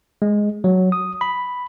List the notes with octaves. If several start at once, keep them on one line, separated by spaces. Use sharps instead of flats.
G#3
F#3
D#6
B5